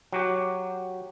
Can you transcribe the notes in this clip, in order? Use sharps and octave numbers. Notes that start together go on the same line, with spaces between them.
F#3 F#4 G4